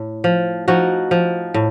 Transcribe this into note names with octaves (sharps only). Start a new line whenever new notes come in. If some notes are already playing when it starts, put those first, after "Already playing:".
Already playing: A2
F3
F3 D#4 F#4
F3
A2